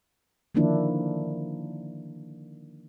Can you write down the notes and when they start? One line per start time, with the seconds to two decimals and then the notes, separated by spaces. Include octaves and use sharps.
0.55 D3 D#3 F3 A#3 D4 E4